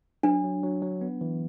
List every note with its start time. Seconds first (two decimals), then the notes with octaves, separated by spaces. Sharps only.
0.23 F#3 D4
0.44 F#3
0.63 F#3
0.82 F#3
1.01 B3
1.21 E3